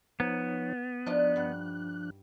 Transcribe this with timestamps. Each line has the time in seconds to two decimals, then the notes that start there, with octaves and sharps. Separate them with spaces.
0.20 F3 B3 D#4 C#5
1.06 F3 D4 D#4 F4 D5 F#6
1.36 G2 F#5